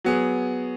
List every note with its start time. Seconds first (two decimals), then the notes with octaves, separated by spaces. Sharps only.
0.05 F#3 B3 G#4